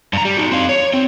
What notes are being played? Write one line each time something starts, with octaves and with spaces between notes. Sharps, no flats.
G2 A#5
G3
D#4 F#4
C4 F5
C#5
C4